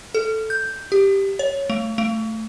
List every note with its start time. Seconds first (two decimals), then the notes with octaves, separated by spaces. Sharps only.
0.15 A4
0.50 G6
0.92 G4
1.39 C#5
1.70 A3
1.98 A3